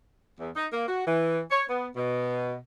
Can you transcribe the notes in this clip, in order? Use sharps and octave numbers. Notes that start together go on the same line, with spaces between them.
E2
D#4
A#3
F#4
E3
C#5
B3
B2